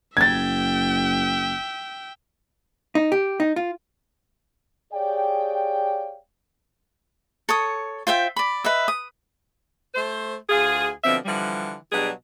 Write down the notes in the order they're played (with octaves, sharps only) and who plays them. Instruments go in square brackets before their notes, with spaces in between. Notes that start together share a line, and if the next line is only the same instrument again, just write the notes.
[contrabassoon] F#1 [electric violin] E5 G5 [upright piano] G#6 A6
[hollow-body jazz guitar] D#4
G4
D#4
F4
[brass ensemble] G4 G#4 C#5 D5 F5 G5
[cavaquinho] A4 C#5 D#6
F4 C5 E5 G5
D5 B5
B4 D#5 E5
D#6
[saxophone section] A3 C5
D2 F4 G#4
B2 D3 F3 C4 E5
D3 E3 F3 G3
B2 F#3 G3 D4 G#4